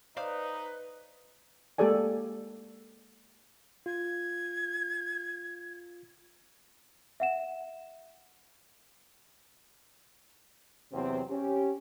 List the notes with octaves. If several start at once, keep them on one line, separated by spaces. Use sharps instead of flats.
D#4 B4 C5 D5 F5
G#3 A#3 G4 A4 D5 G#5
F4 G#6
E5 F#5 E7
E2 C3 F#3 C4
C#4 G4